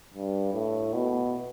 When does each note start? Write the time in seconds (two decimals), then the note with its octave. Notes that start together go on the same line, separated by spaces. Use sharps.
0.14 G2
0.54 A2
0.95 B2